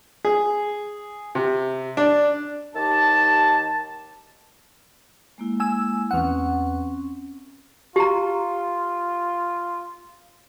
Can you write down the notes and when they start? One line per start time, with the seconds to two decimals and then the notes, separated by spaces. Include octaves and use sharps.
0.25 G#4
1.35 C3
1.97 D4
2.75 D#2 D#3 G4 A5
5.38 G#3 A#3 E4
5.60 G#5 E6
6.11 E2 C4 C#4 F#5
7.96 F4 G4 A#5